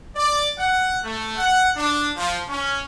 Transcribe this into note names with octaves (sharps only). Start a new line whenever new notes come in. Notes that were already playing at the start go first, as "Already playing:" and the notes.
D5
F#5
A3
F#5
D4
F3
C#4